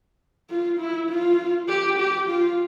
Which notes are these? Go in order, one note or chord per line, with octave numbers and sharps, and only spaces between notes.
F4
E4
F4
G4
G4
F4